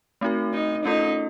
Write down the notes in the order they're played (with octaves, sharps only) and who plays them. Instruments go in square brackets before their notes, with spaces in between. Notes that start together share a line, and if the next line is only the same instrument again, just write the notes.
[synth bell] A3 C4 D#4 F#4 A#4
[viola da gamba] D#4
[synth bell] A3 C#4 F4 A4 [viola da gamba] D#4